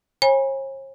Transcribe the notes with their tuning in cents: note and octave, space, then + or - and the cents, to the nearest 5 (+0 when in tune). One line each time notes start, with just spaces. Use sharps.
C#5 -45 G#5 -25 B5 -30